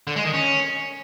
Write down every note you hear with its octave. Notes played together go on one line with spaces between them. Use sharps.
D3
G#3
D#3
C#4